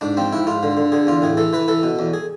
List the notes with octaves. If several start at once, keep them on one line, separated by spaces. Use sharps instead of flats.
G#2 D4
F3 C4
G#2 E4
G#2 F4
D3
D3
D3 G#4
E2 F4
A2 G#4
E3 A4
E3 B4
E3 A4
B2
E2
G#4